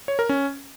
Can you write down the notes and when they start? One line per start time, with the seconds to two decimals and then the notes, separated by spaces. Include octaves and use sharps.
0.08 C#5
0.19 A#4
0.29 C#4